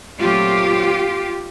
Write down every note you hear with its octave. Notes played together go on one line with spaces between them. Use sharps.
A#2 F#3 A3 C4 F4 G4